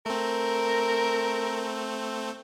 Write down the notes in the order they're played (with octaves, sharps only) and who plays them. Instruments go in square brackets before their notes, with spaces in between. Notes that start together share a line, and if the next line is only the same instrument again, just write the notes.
[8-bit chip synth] A3 C4 [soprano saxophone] A#4